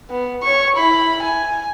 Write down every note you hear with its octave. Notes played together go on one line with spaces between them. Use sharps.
B3
C#5 C#6
E4 B5
G#5